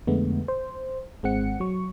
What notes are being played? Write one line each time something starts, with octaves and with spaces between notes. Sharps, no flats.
F2 D3 G#3 A3 B3
C5
G#1 G#3 C4 F#5 C#7
F#3 C#6